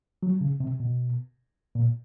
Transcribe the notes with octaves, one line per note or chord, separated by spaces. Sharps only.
F#3
C#3
C3
B2
A#2